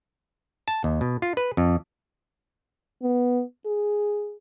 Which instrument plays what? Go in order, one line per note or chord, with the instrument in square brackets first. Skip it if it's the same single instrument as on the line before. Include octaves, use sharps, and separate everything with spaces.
[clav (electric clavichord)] A5
D#2
B2
F4
B4
F2
[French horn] B3
G#4